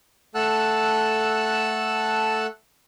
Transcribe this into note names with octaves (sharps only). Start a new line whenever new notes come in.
A3 A4 F#5 A5 E6 F#6